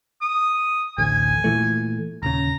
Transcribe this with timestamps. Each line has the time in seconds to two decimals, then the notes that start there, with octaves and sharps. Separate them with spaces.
0.21 D#6
0.98 A1 D2 G#5
1.44 A#2 E3 A3
2.23 D#1 C#3 A#5